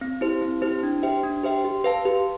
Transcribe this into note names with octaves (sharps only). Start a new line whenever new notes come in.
C4
E4 G4 C5
C4
E4 G4 C5
D4
G4 C5 E5 G5
D4
G4 C5 E5 G5
G4
B4 F5 A5
G4